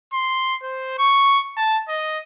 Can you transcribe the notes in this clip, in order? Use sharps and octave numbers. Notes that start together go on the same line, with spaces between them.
C6
C5
C#6
A5
D#5